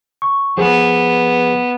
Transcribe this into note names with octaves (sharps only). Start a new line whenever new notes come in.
C#6
F3 B3 G#4 B4